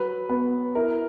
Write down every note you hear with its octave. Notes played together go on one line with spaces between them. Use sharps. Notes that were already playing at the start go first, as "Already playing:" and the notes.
Already playing: F#3 B4
B3 B4
E4 A#4